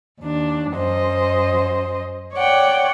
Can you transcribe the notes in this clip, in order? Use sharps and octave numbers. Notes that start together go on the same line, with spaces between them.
D#2 D4
F#2 C5 D#5
C#5 D5 F#5 G5